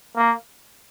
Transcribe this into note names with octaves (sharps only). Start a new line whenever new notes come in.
A#3